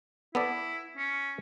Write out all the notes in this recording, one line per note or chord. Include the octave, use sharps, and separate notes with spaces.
B3 E4 A4 D5
C#4